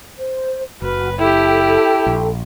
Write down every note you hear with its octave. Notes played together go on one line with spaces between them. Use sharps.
C5
F#1 F#4 B4 F6
E4 G4 A4 G5
A#1